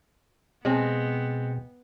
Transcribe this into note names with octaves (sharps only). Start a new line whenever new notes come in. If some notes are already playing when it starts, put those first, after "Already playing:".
B2 G#3 B3 C4